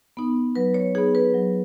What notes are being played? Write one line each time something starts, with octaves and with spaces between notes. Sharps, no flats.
B3 D#4
F#3 B4
C#5
B3 D#4 G#4
B4
F#3